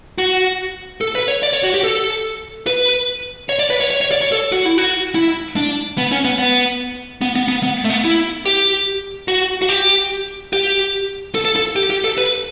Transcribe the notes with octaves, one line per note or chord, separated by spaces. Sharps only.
F#4
A4
B4
C#5
D5
C#5
F#4
G4
A4
B4
C#5
D5
B4
C#5
C#5
C#5
D5
C#5
A4
F#4
E4
F#4
E4
D4
B3
C#4
B3
B3
B3
B3
B3
B3
A3
B3
E4
G4
F#4
F#4
G4
G4
A4
A4
A4
G4
G4
A4
B4